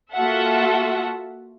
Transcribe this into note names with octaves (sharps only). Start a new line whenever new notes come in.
A#3 F4 F#4 A4 E5 F#5